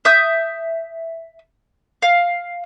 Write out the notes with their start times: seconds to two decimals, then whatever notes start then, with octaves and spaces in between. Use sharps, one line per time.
0.05 E5 D#6 G6
2.02 F5